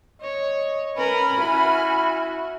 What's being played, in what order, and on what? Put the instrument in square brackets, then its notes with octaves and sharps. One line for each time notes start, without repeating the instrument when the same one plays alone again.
[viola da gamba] C#5 [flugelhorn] D#5
[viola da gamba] C#4 A#4 [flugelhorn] B4 [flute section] G#5 B5 F6
[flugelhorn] E4 [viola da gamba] F#4